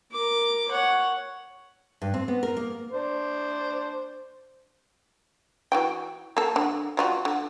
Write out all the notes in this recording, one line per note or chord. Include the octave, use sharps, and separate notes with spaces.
A#4 D6
C#5 F#5
G2
C4
B3
A#4
A#3
D4 C5
E3 F#4 G5
A#3 A4
D3
G3 F4 F#4
D3